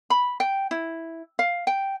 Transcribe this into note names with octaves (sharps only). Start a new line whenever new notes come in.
B5
G5
E4
F5
G5